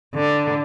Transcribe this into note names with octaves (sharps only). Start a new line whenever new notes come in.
D3